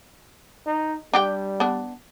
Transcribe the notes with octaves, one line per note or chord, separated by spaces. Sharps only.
D#4
G3 D4 G4 G5
B3 D4